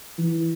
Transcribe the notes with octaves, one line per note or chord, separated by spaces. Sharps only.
E3